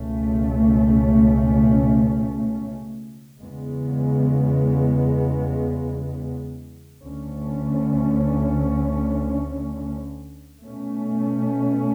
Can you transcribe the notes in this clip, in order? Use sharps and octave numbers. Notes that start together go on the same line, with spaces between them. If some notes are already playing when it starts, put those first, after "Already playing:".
Already playing: C#2 B2 A3 C#4
E2 C#3 G#3 B3
D2 D3 A3 C#4
B2 A3 C#4